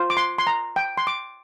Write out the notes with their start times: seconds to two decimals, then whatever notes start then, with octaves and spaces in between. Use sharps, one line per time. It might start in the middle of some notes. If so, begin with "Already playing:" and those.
Already playing: F4 C5
0.10 D6
0.17 C6
0.38 C6
0.47 A#5
0.76 G5
0.98 C6
1.07 D6